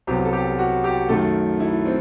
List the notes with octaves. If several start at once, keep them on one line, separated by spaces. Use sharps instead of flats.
C2 C3 F#3 B3 G4
A4
G4
F#4
G4
F#2 D#3 A3 A4
E4
C4